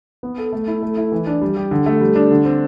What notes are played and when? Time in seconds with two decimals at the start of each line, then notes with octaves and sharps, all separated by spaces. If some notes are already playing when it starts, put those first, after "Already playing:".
0.23 B3
0.38 A4
0.53 A3
0.67 E4
0.82 A3
0.97 E4
1.12 E3
1.27 D4
1.41 G3
1.56 G4
1.71 D3
1.86 A3
2.01 G3
2.15 D4
2.31 D3
2.45 C4